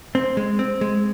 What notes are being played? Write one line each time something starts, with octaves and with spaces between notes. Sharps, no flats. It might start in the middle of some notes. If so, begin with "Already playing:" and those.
C4
G#3
C4
G#3